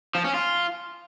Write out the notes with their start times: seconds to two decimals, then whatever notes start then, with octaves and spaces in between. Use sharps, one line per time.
0.15 F3
0.24 C#4
0.34 F4